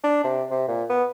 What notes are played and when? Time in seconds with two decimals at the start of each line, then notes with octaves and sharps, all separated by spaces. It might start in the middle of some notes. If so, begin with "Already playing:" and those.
0.04 D4
0.24 C3
0.51 C3
0.68 A#2
0.89 B3